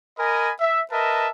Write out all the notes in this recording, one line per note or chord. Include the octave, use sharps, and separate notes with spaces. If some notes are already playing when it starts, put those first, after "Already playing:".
A#4 D#5 G#5 B5
E5
A#4 B4 D#5 E5 A5